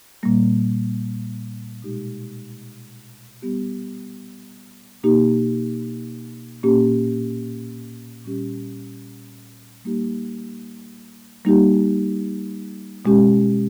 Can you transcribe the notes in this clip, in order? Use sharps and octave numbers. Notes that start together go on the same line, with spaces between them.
A#2 G3 A#3
B2 G#3 D#4 G4
G3 B3 G4
B2 A#3 D#4 G4
A#2 A#3 C#4 G4
A#2 G3 C#4 G4
G3 A#3 D#4 G4
G3 A#3 D#4 G4
B2 G#3 C#4 G4